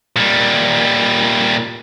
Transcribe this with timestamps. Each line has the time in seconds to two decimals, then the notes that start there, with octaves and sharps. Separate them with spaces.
0.16 A#2 G3